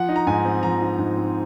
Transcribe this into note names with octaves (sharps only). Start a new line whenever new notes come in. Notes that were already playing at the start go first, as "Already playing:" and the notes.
Already playing: F3 F#5
D#4
A#5
G#2 G#5
C4
F3 A#5
D#4
G#2
C4